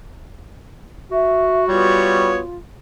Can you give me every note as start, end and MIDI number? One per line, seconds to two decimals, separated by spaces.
1.11 2.44 66
1.11 1.64 76
1.69 2.39 55
1.69 2.39 59
1.69 2.57 65
1.69 2.39 73